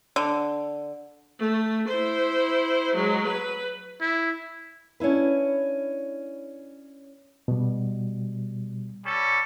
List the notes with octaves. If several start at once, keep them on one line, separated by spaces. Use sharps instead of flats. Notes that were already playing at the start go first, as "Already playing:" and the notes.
D3
A3
E4 C5
F#3 G#3
B4
E4
C#4 D4 E4 B4
B2 G3
G3 C#4 A4